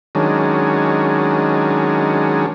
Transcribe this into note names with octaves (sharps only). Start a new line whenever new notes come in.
D#3 F#3 G#3 C#4 D4